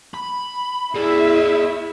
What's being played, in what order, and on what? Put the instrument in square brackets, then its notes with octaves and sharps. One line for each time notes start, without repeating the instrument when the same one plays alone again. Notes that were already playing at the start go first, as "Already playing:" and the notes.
[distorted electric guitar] B5
[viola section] E4 E5 [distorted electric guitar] G#4 D5